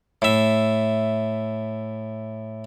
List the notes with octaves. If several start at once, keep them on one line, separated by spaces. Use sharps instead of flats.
A2 E5